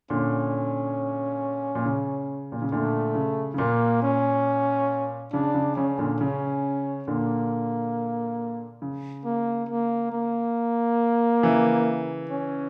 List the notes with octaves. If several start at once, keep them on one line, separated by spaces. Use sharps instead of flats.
A#2 D3 C#4
A#2
C#3
A#2
C#3
A#2 D3 A3
C#3
C#3
A#2 A#3
C#4
C#3 D4
C#3
C#3 C#4
A#2 D3
C#3 C#4
A#2 D3 A#3
C#3
A#3
A#3
A#3
C#3 E3
C#4